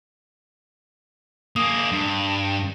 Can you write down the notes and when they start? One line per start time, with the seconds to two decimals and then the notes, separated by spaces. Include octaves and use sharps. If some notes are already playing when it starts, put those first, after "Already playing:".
1.56 A#3 G#4 D#6
1.92 G2